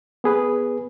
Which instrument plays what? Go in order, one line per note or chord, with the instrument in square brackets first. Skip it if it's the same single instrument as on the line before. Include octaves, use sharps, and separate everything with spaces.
[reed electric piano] B3 G#4 B4